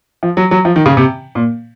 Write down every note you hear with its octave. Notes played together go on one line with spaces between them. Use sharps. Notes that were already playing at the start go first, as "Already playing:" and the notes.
F3
F#3
F#3
F3
D#3
C#3
C3
A#2